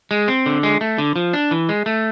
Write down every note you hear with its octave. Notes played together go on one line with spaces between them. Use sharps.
G#3
C4
D3
G#3
A3
D3
F3
D4
E3
G#3
A3